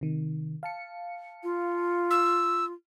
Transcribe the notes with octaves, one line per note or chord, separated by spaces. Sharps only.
C3 D#3
F5 A5 C#7
F4
E6